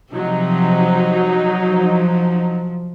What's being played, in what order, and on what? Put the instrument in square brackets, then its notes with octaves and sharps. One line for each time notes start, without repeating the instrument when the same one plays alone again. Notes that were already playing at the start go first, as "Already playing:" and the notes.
[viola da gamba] C3 F3 [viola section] F#3 D#4
[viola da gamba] F3